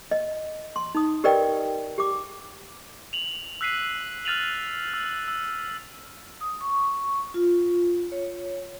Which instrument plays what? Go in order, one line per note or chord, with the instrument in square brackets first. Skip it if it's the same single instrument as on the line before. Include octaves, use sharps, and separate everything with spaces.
[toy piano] D#5
C6
D#4 D#6
G4 A#4 B4 D5 D#5 G5
G4 D6
[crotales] F7 F#7
E6 F#6 B6 C7 D#7
F6 F#6 A6 D#7 F7 F#7
E6
E6
[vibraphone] D#6
C#6
F4
C#5